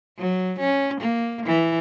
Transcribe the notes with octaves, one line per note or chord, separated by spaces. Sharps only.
F#3
C#4
A#3
E3